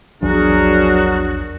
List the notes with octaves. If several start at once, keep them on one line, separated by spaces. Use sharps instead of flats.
A#1 E2 F3 F#3 D4 F#4 G#4 A#4